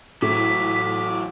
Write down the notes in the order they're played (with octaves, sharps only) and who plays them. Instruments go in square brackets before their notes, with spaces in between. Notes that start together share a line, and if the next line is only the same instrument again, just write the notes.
[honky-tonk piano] A2 A3 [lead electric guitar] E3 F#3 [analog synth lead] D6 [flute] B6